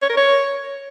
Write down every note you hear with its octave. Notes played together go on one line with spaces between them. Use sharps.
C#5
A#4
C#5